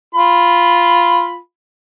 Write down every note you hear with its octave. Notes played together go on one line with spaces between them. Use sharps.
F4 B5